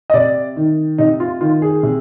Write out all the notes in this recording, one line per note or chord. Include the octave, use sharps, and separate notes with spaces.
D#5
C3 D5
D#3
C3 D#4
F4
D#3 F4
G#4
C3